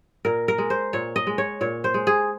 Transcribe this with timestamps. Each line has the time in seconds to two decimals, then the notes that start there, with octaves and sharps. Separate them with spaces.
0.25 A#2 A#4
0.48 A#4
0.58 G#3
0.70 C5
0.93 A#2 C#5
1.16 D#5
1.27 G#3
1.38 C#5
1.61 A#2 C#5
1.84 C5
1.94 G#3
2.07 G#4